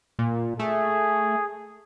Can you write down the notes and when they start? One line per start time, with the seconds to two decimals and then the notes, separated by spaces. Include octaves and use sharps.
0.19 A#2
0.59 A3 G#4